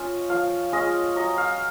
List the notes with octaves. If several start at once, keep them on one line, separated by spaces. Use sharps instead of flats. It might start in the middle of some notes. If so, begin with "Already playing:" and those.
Already playing: C#4 F4 D#5
F3 F5
G#3 C#4 F4 D#5
F#3 D#5
F5